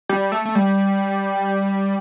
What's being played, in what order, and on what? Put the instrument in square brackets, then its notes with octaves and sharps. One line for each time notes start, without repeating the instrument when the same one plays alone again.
[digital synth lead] G3
A3
A3
G3